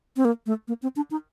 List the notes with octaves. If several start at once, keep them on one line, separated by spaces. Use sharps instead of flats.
C4
A#3
A3
A#3
C4
D4
D#4